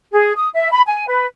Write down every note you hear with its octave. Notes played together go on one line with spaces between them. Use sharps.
G#4
D#6
E5
B5
G#5
B4